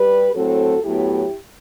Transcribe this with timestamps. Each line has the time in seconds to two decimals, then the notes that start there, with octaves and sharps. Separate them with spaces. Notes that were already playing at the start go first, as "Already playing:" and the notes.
Already playing: G3 G4 B4
0.35 A2 F#3 C4 F#4 A4
0.84 A2 F#3 B3 E4 G4